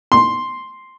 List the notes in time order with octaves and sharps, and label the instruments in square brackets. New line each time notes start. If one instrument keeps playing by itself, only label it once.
[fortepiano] C6